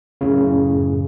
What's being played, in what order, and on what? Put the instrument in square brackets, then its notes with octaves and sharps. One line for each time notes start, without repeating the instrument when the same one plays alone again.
[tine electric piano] F#2 A2 C#3